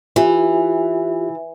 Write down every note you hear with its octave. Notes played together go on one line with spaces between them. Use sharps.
E3 F4 G4